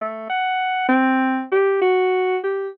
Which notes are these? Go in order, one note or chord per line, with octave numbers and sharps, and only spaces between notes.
A3
F#5
C4
G4
F#4
G4